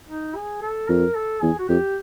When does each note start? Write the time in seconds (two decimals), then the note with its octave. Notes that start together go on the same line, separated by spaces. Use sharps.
0.09 D#4
0.36 G#4
0.62 A4
0.89 F2 A#4
1.15 A4
1.42 E2 G#4
1.59 F#4
1.69 F2 G4